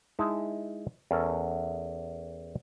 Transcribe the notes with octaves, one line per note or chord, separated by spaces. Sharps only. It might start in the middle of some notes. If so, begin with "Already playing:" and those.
G#3 D#4 E4 A5
E2 C#4 A4 A#4